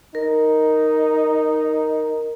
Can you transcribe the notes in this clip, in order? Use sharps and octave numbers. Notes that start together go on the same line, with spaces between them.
D#4 A#4